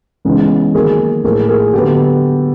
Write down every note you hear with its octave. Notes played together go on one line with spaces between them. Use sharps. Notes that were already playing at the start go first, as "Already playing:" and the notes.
C#3 E3 G#3 B3
D#3 F#3 A#3 G#4 A#4
A2 F3 A#3 G#4 A#4
G#4 A#4
D3 F#3 B3 G4 A4